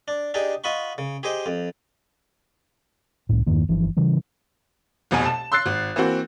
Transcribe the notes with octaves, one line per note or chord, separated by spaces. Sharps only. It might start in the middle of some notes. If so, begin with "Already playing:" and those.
D4
D4 D#4 G4 G#4
F4 D#5 F#5 B5 C#6
C#3
G4 G#4 C5 D#5
F2
C2 A2
E2 G2 D#3 A#3
G1 E3 F3
C#3 E3 G3
F1 C2 B2 G#5
A5
C6 E6 F#6 A6 C7
G#1
E3 A#3 C4 F#4